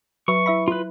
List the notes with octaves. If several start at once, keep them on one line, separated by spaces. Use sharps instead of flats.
F#3 B4 E5 C#6
E4 E5 B5
F4 B4